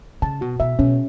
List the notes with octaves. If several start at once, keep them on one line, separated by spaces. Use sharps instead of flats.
C#3 A5
B2 F#4
B2 E5
B2 C#4